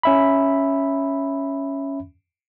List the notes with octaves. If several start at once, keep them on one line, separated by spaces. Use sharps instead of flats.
C#4 E5 B5